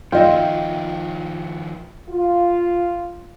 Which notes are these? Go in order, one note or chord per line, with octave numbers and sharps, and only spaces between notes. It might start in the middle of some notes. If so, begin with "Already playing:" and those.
D#3 F3 F4 C#5 D#5 E5 G5
F4